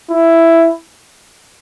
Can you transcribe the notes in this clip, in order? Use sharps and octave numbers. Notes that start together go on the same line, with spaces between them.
E4